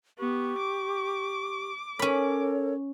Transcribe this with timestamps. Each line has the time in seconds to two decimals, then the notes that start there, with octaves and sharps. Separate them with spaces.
0.19 B3 G4 C#6
0.59 D6
1.99 C#4 A4 A#4 C#5 B5